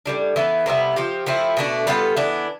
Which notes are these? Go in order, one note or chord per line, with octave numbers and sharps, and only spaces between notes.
A2 E3 G3 D4
E3 B3 E4
C3 G3 B3 E4
F3 C4 G4
F3 A3 C4 E4
B2 A3 D4
G3 B3 F4 A4
E3 B3 D4